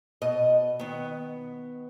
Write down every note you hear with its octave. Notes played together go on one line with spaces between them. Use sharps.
B2 D#5
D#3 B3